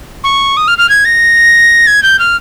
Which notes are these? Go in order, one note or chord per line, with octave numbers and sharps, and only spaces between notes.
C#6
D#6
F6
F6
G#6
A#6
G#6
G6
F6